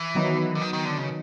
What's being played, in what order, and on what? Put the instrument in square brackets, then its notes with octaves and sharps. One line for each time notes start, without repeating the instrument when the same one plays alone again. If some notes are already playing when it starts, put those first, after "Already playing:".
Already playing: [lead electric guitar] E3
[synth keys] D#3 F#3 B3 D#4
[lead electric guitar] D3
D#3
D#3
D3
C#3